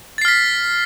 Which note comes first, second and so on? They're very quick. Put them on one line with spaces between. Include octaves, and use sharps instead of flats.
A6 C7 F6 B6